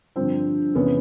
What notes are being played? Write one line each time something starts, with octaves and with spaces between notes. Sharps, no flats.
G2 D3 F3 C4 D4
E2 C3 E3 B3 C#4